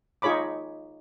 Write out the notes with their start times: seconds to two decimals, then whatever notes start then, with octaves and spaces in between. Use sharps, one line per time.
0.22 D#4 F4 G#4 C#5 B5 D6